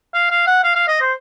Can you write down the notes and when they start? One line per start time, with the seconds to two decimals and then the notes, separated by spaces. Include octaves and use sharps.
0.14 F5
0.31 F5
0.47 F#5
0.64 F5
0.76 F5
0.88 D#5
1.01 C5